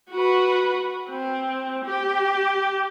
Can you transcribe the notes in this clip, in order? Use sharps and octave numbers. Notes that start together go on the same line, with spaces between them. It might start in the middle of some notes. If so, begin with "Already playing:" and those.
F#4 B4
C4
G4